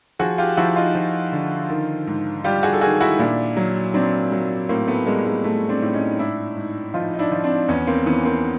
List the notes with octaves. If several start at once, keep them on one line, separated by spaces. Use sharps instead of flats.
F3 F#4 G#4
F4 G4
F3 E4 F#4
D#4 F4
F3
D3
D#3
G#2
G3 F4 G4
F#4 G#4
A4
D#3 F#4 G#4
E4 F#4
A#2 D4 E4
F#3
F#3 C4 D4
F#3
A2 A#3 C4
A3 B3
G3 G#3 A#3
G#3
A2 A3
C4 D4
A2
C#4 D#4
G#2 D4 E4
G#2
F3 D#4 F4
D#4
D4 E4
F3
C4 D4
E2 B3 C#4
A#3 C4
E3 B3 C#4
A#3 C4